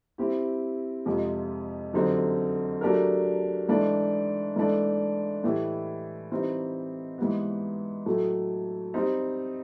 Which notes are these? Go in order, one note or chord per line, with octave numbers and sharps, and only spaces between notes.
G3 C4 E4 G4
F2 C3 F3 G#3
F#2 D3 G3 C4 D#4
F#3 A3 D4 G4 A#4
G#2 E3 A3 D4
G#2 E3 A3 D4
A2 E3 G3
E3 G3 C4 D#4
G#2 E3 G3 B3
A2 F#3 A3
G3 C4 D#4